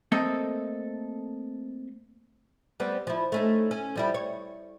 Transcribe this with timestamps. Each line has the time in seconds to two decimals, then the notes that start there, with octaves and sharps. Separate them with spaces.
0.12 A3 A#3 C4 A4 D#5 E5
2.80 G3 B3 C4
3.07 F3 E4
3.32 A3 C#4 D#4
3.71 C#4
3.96 F3 G3 E4
4.14 C#5